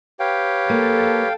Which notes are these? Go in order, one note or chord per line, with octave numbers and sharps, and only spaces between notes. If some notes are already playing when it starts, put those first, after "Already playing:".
G4 B4 C#5 F5 G5
A#3 A4